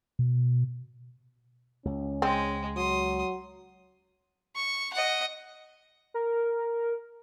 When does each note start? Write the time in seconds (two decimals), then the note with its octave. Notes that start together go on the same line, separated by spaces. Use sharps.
0.19 B2
1.85 C#2 C#4
2.22 G#3 C4
2.77 F#3 C6 D#6
4.56 C#6
4.93 D#5 F#5
6.14 A#4